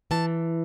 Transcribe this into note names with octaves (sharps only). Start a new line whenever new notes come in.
E3 A5